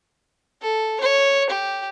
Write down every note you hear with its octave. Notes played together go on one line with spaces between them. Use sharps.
A4
C#5
G4